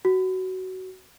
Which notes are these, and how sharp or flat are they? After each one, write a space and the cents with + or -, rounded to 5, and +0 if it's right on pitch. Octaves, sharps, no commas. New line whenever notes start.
F#4 +15